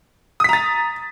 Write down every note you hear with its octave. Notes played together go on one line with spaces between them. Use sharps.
A#5 D#6 A6 B6